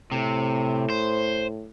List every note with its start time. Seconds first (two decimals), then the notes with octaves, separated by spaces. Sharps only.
0.12 A2 C3
0.90 C5